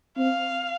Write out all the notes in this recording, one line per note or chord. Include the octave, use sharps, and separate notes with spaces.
C4 F5